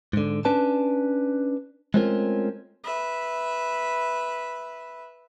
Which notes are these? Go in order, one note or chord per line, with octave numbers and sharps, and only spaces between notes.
G#2 D3
C#4 D4 B4 A5
G#3 A3 C4 C#4 F4 A#4
B4 E5